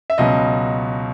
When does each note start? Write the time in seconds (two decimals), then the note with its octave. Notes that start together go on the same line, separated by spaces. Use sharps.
0.10 E5
0.18 C#2 B2 F#3 D#5